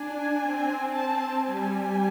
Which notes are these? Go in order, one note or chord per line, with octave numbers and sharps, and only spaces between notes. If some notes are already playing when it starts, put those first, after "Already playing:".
Already playing: D4 G#5
C4
A5
G3 G#5